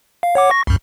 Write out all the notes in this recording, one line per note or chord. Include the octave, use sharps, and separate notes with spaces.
F5
C#5 F#5 D6
C#6 A#6
C2 F#2